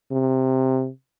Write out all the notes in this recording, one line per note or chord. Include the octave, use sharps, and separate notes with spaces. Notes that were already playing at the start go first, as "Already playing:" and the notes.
C3